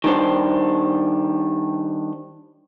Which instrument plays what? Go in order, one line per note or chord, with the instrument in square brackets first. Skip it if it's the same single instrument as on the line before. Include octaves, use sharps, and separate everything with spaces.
[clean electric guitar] D#3 G3 D4 C5